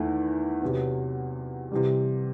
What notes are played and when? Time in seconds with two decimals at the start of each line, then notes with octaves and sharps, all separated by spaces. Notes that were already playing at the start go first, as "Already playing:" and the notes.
Already playing: E2 D#3 A3 E4
0.62 E2 C3 F#3 B3
1.72 C3 E3 G3